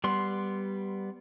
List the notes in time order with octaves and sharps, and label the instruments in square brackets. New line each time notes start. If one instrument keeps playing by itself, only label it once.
[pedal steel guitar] G3 B3 C6